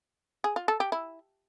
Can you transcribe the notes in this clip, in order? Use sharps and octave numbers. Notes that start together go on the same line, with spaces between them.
G#4
F4
A4
G4
E4